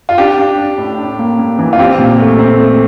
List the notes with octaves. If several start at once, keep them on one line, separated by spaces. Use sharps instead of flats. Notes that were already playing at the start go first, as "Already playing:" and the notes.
F4
D4 G4
D4
D4
A2
D4
A#3
A#3
E3
F4
C4 G4
A#2
A3
C4
A3